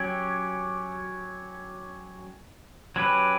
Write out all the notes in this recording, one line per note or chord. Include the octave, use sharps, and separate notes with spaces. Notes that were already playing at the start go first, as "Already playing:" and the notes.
Already playing: F#3 C#4 G4 C#5
F#3 C#4 G4 B4